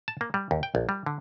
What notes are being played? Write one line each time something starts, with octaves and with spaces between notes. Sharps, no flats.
A5
A#3
G3
D#2
G5
A#1
G3
D3